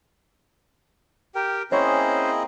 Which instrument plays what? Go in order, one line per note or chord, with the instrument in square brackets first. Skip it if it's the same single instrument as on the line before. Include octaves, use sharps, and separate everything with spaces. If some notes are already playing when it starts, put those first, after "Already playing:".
[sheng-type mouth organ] G4 G5 [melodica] A#4
[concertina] A#3 C4 [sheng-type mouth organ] C#4 C5 [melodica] E4 G#4 D#5 [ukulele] C#5